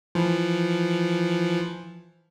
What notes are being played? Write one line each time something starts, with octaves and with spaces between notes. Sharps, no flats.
E3 F3